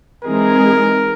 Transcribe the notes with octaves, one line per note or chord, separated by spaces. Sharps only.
E3 G#3 C4 D#4 G#4 A#4